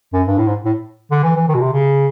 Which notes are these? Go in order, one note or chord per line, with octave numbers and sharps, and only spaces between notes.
F#2
G2
A2
G#2
A2
D3
E3
E3
D#3
B2
C3
C#3